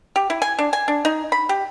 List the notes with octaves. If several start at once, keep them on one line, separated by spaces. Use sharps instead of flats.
G4
E4
G#5
D4
G#5
D4
D#4
B5
G4